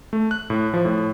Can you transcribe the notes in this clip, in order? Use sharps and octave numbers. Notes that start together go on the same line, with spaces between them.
A3
F#6
A2
F3
A2